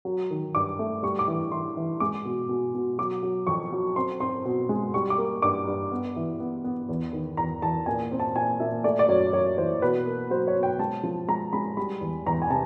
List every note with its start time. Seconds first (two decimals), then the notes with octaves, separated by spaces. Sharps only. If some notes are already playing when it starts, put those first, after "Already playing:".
0.05 F#3
0.30 D#3
0.55 G2 D6
0.79 A3
1.03 G3 C#6
1.19 D6
1.28 E3
1.52 E3 C6
1.77 E3
2.00 G#3 D6
2.25 B2
2.49 B2
2.75 B2
2.98 F#3 D6
3.23 F#3
3.47 F2 C#6
3.72 F#3
3.96 C4 C6
4.20 C4 C6
4.45 B2
4.69 G#3
4.94 G3 C#6
5.10 D6
5.18 A#3
5.42 G2 D6
5.67 G2
5.92 B3
6.16 E3
6.40 B3
6.64 B3
6.89 E2
7.13 D#3
7.37 E2 A#5
7.62 E2 A5
7.86 A#2 G#5
8.12 C4
8.20 A5
8.35 A#2 G#5
8.60 A#2 E5
8.84 A3 D5
8.99 D5
9.08 F#2 C#5
9.33 F#2 C#5
9.58 E3 C5
9.82 B2 B4
10.06 A#3
10.30 F#3 C5
10.47 C#5
10.55 B2
10.63 G5
10.79 G#3 A5
11.03 F3
11.28 G#3 A#5
11.53 G#3 B5
11.77 G3 B5
12.01 E2
12.26 E2 A#5
12.42 G#5
12.50 C3 A5